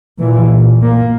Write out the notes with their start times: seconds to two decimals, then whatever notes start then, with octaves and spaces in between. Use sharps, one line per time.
0.20 A#2 E3
0.82 A#3